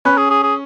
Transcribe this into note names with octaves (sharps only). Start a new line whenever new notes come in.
C#4 B4
G#4
G#4
G#4